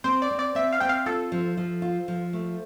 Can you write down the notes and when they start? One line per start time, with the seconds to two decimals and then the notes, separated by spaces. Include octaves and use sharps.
0.04 C4 C5
0.22 D5
0.31 C4
0.39 D5
0.55 C4 E5
0.72 F5
0.80 C4 G5
0.89 F5
1.06 F4 A4
1.32 F3
1.57 F3
1.82 F4
2.08 F3
2.33 A3